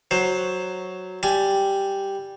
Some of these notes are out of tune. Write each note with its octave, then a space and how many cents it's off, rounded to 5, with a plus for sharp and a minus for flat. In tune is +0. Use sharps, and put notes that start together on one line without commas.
F#3 +0 C5 +15
G3 +0 G#5 +15